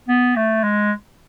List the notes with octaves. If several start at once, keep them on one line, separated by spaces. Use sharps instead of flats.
B3
A3
G#3